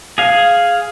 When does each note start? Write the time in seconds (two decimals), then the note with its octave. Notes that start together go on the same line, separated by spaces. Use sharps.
0.18 G#4 F5